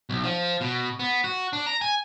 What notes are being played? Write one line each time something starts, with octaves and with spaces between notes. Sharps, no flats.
B1
F3
B2
B3
F#4
D4
A#5
G#5